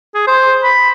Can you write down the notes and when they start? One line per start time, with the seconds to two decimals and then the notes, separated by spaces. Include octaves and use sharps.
0.14 G#4
0.27 C5
0.64 B5